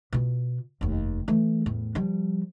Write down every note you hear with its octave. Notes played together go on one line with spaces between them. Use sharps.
B2 F4
F1 D#2
E3 A3
E2 A2
F3 G3